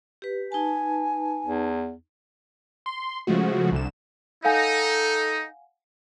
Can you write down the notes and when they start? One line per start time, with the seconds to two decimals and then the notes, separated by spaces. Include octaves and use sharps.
0.22 G4 B4
0.52 D#4 B4 G#5 A5
1.47 E2
2.86 C6
3.27 C#3 F3 G#3 A3 F#4
3.72 C2 D3 E7
4.45 D#4 A4 F5 F#5 G#5